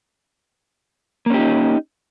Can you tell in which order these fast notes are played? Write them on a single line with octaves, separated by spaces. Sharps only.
A#3 C#4 G4 D#4